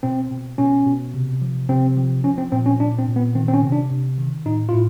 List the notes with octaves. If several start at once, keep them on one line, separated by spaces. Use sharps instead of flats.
B2 C4
B2
B2 C#4
B2
C3
F3
C3 C4
F3
F3 C#4
C4
A#2 C4
C#4
A#2 D4
C4
A#2
B3
D#3 C4
C4
C#4
C3
D4
C3
D#3
A2 D#4
F4
A2 E4